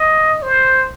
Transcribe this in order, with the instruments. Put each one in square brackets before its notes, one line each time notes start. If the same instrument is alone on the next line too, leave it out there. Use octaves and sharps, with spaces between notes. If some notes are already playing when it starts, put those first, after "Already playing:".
Already playing: [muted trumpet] D#5
C5